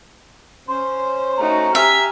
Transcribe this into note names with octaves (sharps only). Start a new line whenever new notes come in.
C#4 C5 C6
A3 D#4 F#4 A#5
G4 E5 G#5 F6